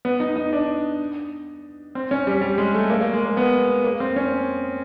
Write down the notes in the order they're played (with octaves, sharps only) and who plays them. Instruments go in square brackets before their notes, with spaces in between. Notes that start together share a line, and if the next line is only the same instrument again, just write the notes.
[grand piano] B3
D#4
D#4
D4
C4
C#4
G3
G3
G#3
A3
A#3
A#3
G#3
A#3
B3
A#3
C4
C#4